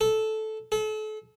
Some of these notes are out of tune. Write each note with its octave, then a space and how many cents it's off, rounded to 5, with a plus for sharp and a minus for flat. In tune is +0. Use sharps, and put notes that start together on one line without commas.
A4 -10
A4 -35